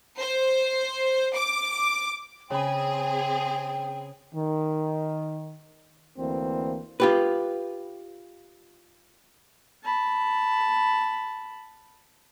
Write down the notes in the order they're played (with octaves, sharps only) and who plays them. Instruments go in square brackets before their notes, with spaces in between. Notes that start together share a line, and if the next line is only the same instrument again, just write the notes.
[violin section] C5
D6
[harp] C#3 B5 [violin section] C4 G#4 [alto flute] G5
[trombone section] D#3
D2 E3 A#3 C4
[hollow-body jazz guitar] F4 G4 B4
[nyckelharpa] A5 B5